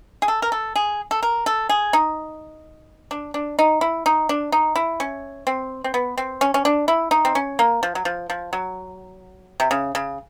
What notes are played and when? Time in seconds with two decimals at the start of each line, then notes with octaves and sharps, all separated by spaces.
0.22 G#4
0.28 A4
0.42 A#4
0.52 A4
0.76 G#4
1.11 A4
1.23 A#4
1.46 A4
1.69 G#4
1.93 D#4
3.11 D4
3.34 D4
3.59 D#4
3.81 E4
4.06 D#4
4.29 D4
4.52 D#4
4.76 E4
5.00 C#4
5.47 C4
5.84 C4
5.94 B3
6.17 C4
6.41 C#4
6.54 C#4
6.65 D4
6.88 E4
7.11 D#4
7.25 C4
7.35 C#4
7.59 A#3
7.83 F3
7.95 F#3
8.05 F3
8.30 F3
8.53 F#3
9.60 C3
9.71 C#3
9.95 C#3